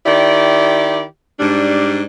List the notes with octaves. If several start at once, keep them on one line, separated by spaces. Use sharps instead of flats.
D#3 E4 G4 D5
G#2 G3 D4